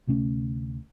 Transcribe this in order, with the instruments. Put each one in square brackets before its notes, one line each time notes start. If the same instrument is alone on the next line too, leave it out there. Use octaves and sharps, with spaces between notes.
[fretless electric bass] D2 C3 A3 C#4